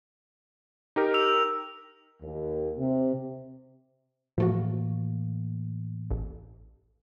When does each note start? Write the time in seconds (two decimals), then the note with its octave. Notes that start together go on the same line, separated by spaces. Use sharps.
0.96 D#4 G4 A#4
1.14 E6 F7
2.22 D#2
2.79 C3
4.38 A2 E3 F3 A3 A#3 F#4
6.11 A1